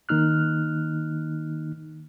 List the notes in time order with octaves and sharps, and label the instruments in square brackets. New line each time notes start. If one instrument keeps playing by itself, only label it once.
[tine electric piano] D#3 A#3 D#4 F6 F#6